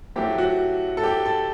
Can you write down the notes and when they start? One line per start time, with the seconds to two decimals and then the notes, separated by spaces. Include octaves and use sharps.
0.16 A2 F#3 A3 G4
0.38 F#4
0.97 A4
1.04 G4
1.26 A4